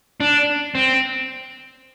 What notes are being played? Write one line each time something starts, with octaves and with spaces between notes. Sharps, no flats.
D4
C4